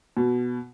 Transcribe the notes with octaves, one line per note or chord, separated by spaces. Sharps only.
B2